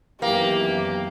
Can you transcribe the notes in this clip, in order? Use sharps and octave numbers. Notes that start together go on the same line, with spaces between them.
F#2 B2 D#3 E3 A#3 G4